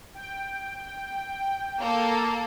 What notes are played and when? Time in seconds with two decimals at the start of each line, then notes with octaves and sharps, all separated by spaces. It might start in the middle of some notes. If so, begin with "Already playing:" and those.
0.15 G5
1.81 A#3 A4